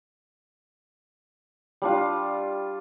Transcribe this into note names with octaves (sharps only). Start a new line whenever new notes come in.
G3 D4 F4